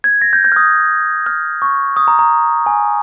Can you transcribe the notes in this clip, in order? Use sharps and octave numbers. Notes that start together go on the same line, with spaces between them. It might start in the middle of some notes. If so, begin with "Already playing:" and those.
G#6
A#6
G6
G6
F6
D#6
F6
C#6
D#6
A#5
A#5
G#5